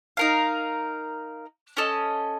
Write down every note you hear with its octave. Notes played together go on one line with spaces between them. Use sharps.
D#4 A#4 F5
C#4 A4 D#5